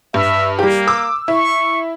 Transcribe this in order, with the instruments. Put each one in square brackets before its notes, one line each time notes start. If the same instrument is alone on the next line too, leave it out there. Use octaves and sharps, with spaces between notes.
[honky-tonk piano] G2 [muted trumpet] E5
[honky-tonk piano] G3 G4 [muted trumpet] A#3
[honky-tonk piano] D6 E6
[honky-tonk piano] E4 [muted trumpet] C#6